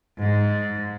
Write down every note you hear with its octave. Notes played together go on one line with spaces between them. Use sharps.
G#2